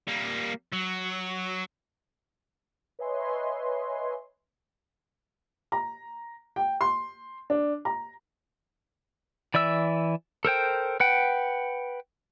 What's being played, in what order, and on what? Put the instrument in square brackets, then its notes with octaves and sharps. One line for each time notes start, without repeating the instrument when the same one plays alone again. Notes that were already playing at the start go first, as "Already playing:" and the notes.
[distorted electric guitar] G3 A#3
F#3
[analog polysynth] B4 C#5 D#5 E5 G#5 C6
[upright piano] A#5
G5
C6
D4
A#5
[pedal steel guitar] E3 D5 E5 E6
A4 A#4 C5 G5
B4 F#5 G5